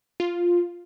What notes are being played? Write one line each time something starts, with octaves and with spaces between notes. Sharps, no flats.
F4